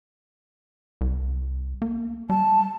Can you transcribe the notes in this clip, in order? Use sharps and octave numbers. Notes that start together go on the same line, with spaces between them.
C2
A#3
G3 A5